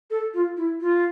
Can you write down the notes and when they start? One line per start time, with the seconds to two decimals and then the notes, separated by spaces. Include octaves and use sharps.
0.10 A4
0.34 F4
0.57 E4
0.81 F4